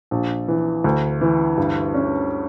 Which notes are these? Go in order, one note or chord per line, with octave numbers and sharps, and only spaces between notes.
A#1
E3
D2
E3
G2
C#4